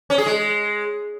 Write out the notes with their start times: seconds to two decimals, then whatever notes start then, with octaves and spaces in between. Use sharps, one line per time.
0.10 C#4
0.18 G#4
0.26 G#3